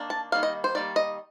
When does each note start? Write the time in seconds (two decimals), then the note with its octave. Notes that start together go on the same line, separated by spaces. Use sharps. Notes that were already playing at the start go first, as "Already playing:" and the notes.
Already playing: D#3 A#3 D4
0.10 A5
0.32 D#3 G3 A#3 F5
0.43 D#5
0.64 C5
0.75 D#3 G3 A#3 D5
0.96 D#5